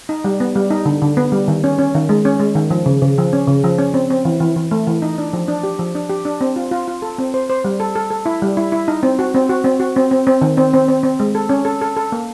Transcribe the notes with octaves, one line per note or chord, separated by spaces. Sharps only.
D#4
G3
B3
G3
D#4
D3
D3
B3
G3
D#3
C#4
C#4
D#3
G#3
C#4
G#3
D#3
F3
C#3
C#3
F3
C#4
C#3
F3
C#4
C4
C4
E3
E3
E3
A3
E3
D#4
D4
F3
D4
G4
F3
D4
G4
D4
C4
F4
F4
F4
A4
C4
C5
C5
G3
A4
A4
A4
E4
G3
E4
E4
D#4
C4
F#4
C4
F#4
C4
F#4
C4
C4
C4
D#3
C4
C4
C4
C4
G#3
A4
C#4
A4
A4
A4
A#3